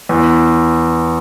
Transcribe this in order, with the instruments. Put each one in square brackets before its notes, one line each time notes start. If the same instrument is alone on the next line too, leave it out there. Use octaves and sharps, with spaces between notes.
[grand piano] E2